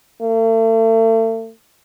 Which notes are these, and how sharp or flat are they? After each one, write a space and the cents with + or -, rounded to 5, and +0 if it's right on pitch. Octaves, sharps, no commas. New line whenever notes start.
A3 +40